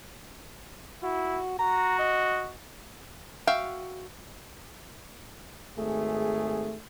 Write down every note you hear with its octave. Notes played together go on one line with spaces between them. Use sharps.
E4 F#4
F#4 A#5
D#5
F#4 E5 F5 G5
G#1 A3 G#4